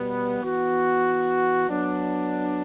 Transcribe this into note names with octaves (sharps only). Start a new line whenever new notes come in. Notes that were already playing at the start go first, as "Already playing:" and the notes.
Already playing: B2 G3 B3
E3 B3 F#4
F#3 B3 D4